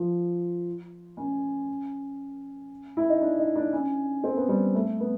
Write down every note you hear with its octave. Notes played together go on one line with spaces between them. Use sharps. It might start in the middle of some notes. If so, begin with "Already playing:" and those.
Already playing: F3
C#4
E4
D#4
D4
D#4
D4
C#4
C4
B3
G3
A3
B3